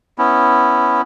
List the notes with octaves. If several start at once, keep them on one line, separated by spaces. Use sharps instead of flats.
B3 C#4 E4